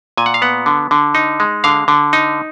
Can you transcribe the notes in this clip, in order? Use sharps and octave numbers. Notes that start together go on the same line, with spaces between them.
A#2 G#5
F#5
F5
B3 F#5
D3
D3
D#4
G#3
D3 F5
D3
D#4